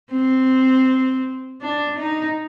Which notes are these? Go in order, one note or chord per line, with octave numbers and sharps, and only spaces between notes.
C4
D4
D#4